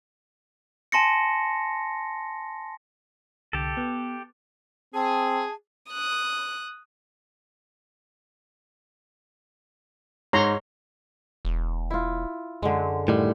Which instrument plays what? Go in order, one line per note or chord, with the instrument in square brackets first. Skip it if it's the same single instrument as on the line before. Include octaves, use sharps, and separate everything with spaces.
[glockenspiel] G#5 A5 C6 A#6 C#7
[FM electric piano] C2 D3 [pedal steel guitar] G4 A4
[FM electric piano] B3
[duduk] C4 [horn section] G#4 [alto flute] A5
[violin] D#6 F#6
[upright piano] G#2 [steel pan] C#5 A#5 C6
[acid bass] E1
[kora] E4 F4
[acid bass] F#2 [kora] D3 G#3
[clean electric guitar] A2 D#3 G3